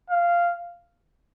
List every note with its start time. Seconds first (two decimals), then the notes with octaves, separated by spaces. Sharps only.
0.10 F5